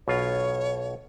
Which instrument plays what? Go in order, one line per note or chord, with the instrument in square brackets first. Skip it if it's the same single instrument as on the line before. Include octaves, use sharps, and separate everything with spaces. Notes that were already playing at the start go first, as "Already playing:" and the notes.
[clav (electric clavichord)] B1 B2 F4 [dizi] C#5